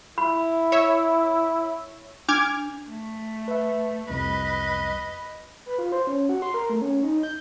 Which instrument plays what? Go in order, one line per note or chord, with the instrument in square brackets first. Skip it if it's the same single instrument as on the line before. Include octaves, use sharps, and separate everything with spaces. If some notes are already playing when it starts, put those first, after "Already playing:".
[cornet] E4 [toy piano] B5
[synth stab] C#5 E5
[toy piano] D4 [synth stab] D6 F6 G#6
[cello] A3
[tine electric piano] B4 E5
[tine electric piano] C2 F2 [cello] B4 D#5
[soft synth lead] B4
F4
C5
C#4
F#4
C6
A#4
A3
C#4
D#4
G6